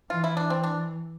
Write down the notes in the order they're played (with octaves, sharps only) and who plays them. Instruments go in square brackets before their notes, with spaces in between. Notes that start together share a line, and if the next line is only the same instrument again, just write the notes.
[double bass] E3 [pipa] F4
[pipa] E4
D4
C4
D4